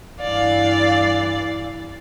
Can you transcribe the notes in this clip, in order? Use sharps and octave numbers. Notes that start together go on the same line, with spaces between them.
G2 E3 D5 F5